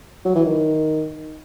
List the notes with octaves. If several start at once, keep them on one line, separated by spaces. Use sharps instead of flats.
F#3
E3
D#3